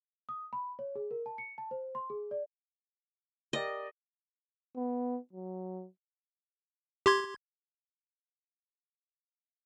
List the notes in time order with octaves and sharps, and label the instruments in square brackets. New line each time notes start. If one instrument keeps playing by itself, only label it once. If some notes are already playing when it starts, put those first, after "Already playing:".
[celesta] D#6
B5
C#5
G#4
A#4
A5
C#7
A5
C5
C6
G#4
D5
[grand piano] G4 A#4 D5 [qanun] D#5
[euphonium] B3
F#3
[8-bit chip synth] G4 C6 G#6